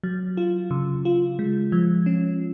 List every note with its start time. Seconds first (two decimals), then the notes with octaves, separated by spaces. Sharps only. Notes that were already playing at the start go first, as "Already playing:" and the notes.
0.03 F#3
0.37 F4
0.71 C#3
1.05 F4
1.39 G#3
1.72 F3
2.06 C#4